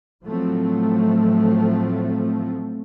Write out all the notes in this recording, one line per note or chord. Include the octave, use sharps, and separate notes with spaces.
A2 F3 F#3 A3 C4